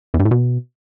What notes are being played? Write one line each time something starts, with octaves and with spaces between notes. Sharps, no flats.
E2
G2
A2
B2